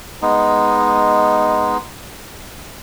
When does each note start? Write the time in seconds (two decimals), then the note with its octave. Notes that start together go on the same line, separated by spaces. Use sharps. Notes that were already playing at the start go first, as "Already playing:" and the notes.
0.22 G#3 B3 D#4